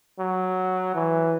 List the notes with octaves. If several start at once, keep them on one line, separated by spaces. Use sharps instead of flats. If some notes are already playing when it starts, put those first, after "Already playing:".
F#3
E3